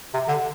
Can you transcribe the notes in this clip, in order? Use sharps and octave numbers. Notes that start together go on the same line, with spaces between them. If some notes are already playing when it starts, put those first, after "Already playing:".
C3
D3